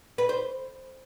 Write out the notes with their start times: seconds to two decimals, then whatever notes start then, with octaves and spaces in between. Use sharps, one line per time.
0.18 B4
0.29 C5